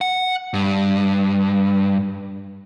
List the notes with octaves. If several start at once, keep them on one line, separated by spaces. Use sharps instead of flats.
F#5
G2